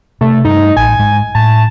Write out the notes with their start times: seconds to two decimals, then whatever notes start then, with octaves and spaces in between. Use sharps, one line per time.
0.21 C3 A3
0.45 G2 D#4
0.77 A1 G#5
0.99 G#2 G#3
1.35 A2 A5